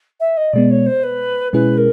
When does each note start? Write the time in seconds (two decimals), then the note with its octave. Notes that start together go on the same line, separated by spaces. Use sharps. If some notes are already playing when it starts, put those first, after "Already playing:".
0.20 E5
0.37 D#5
0.53 B2 G#3 B3 D5
0.71 C#5
0.86 C5
1.03 B4
1.53 B2 G#3 C#4 E4 G#4 B4
1.77 A#4